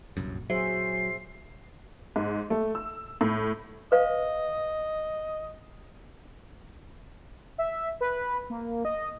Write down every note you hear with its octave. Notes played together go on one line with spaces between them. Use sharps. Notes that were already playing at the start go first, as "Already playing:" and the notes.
G1 C2 F#2 A#2
F#3 G#4 C5 E5 C7
G#2
A3
E6
A2
B4 D#5 F5
E5
B4
A#3
D#5